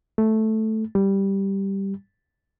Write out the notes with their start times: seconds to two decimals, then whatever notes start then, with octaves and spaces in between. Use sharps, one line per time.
0.18 A3
0.95 G3